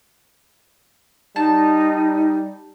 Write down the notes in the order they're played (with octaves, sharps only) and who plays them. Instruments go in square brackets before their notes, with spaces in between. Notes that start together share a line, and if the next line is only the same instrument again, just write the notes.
[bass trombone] G3 [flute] D#4 [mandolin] A5